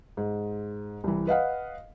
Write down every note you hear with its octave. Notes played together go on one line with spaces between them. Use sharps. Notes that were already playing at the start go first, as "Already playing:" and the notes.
G#2
C2 E3
B4 D#5 F5 F#5